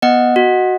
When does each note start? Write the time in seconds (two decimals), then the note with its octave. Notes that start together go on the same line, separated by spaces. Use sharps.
0.02 B3 D#5 F#5
0.36 F#4